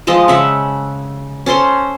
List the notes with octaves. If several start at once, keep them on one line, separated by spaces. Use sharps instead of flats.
F3 G#3 D#5 A5
C#3 E5 F#5
C#4 A4 C5 C6